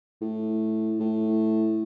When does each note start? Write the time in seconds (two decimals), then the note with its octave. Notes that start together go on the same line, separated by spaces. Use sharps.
0.21 A2
1.00 A2